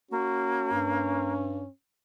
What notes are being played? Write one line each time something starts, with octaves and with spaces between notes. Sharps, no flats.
A#3 C#4 F#4
G2